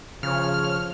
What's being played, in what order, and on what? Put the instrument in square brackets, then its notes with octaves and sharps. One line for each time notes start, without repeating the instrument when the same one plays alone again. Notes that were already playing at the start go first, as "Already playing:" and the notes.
[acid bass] C#3 [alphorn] F3 [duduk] C#5 [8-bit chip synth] F6